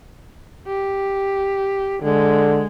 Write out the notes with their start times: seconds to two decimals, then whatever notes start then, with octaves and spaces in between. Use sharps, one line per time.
0.67 G4
2.03 D3 G#3